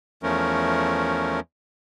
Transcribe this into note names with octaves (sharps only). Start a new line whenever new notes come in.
E2 F3 A3 C#4 A#4